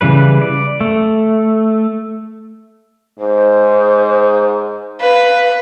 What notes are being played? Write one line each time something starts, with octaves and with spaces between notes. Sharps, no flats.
C#3 E3 G3 B4
D5
A3
G#2 C5
B4 F5